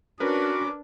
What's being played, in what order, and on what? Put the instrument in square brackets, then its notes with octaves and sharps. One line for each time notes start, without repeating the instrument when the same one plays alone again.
[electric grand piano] C#4 A#4 B4 [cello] D4 [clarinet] F#4 [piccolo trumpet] D6